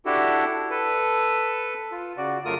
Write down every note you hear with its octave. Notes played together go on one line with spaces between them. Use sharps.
D4 E4 F#4 G4 A4
A4 B4
F4
C#3 F#4 D5
F#2 C#3 A3 F4 A#4 D#6